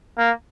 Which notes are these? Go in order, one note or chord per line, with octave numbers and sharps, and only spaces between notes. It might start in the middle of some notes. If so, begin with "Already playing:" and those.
A#3